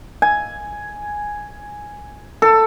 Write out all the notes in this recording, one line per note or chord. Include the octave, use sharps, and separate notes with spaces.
G#5
A4